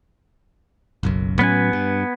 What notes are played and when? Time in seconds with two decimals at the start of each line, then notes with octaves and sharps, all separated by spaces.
1.03 F#1 B1 F#2
1.39 A2 F#3 B3 C#4 B4 G#5
1.73 G2